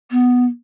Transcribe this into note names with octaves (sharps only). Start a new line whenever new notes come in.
B3